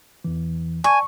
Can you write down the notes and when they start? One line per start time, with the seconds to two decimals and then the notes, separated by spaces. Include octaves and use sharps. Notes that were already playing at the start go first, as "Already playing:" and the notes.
0.24 E2 E3
0.84 D5 G#5 A5 C#6